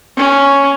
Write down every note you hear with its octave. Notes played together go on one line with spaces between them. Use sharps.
C#4